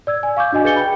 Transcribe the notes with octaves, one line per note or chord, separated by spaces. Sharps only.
D5 E6 G#6
G#5
F5 C#6 D6 G6
D4 F#4 D#5 G#5
G#4 B4 G6 A6 C#7 G7
G5 B5